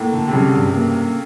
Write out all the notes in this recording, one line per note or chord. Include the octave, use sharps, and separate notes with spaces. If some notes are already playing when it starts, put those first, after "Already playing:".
Already playing: A2 A#3
D3
C3
C#3 G3
G2
A#3